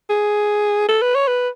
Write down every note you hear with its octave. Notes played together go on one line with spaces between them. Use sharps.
G#4
A4
B4
C#5
B4